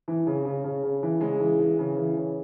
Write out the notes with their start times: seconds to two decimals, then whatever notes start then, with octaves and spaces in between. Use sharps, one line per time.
0.08 E3
0.27 C#3
0.45 C#3
0.64 C#3
0.83 C#3
1.03 E3
1.21 C#3 G#3
1.40 E3
1.59 E3
1.79 C#3
1.97 E3
2.17 C#3